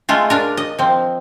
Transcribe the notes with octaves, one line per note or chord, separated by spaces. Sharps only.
G#3 A3 F4
D4 A#4
D#5
F3 C4